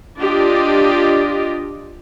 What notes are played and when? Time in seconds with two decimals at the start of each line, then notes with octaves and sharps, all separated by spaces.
0.20 D4 F4 G4 D5 D#5